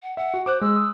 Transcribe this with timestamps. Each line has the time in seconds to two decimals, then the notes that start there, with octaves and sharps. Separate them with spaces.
0.03 F#5
0.17 E5 F#5
0.34 F#4
0.46 C5 D6 F#6
0.61 G#3 E6
0.76 D#6